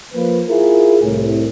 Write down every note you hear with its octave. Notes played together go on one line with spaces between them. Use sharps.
F3 A#3 B4
E4 F4 G#4 A#4
C2 A2